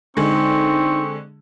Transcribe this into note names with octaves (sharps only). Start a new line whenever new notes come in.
D3 G#3 C4 D#4 C#6